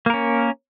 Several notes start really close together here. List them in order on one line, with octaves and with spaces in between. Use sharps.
A#3 A#4 C#4